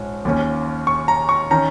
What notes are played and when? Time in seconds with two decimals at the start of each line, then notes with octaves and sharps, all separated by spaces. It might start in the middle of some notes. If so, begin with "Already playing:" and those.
Already playing: A#1 G#2 C#4
0.25 D#2 D#3 A#3 C#4
0.87 C#6
1.08 A#5
1.29 C#6
1.51 D#3 C#4 A#5